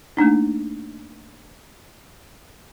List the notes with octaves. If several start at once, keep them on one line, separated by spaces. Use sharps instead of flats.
A3 A#3 D4 D#4